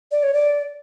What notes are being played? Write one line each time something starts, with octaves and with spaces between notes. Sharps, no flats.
D5
C#5
D5